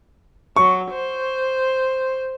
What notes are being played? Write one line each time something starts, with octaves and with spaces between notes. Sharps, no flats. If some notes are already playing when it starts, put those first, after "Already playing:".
F#3 C#6
C5